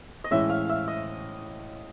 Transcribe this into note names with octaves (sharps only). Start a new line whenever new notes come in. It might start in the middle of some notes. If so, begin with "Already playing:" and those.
D#5
A2 E3 G#3 C#4 E5
F5
E5
D#5